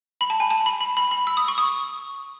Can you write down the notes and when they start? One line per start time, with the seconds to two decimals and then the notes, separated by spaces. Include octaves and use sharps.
0.21 B5
0.30 A5
0.40 G#5
0.50 A5
0.66 B5
0.81 B5
0.97 B5
1.11 B5
1.27 E6
1.37 D#6
1.48 C#6
1.58 D#6